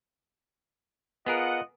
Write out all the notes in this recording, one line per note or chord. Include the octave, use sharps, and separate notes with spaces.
B3 F4 G#4 A#4 D#5 F#5